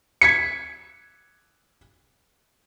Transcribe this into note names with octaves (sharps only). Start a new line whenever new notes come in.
G#6 B6 C#7